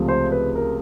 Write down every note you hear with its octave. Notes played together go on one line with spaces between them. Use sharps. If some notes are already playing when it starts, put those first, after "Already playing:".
Already playing: C#2 C3 F3 A3
C5
B4
A#4